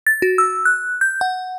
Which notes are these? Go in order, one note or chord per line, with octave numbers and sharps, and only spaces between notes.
A6
F#4
E6
F#6
G6
F#5